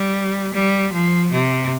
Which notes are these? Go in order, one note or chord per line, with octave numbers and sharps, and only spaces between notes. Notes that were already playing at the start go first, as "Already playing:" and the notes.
Already playing: G3
G3
F3
C3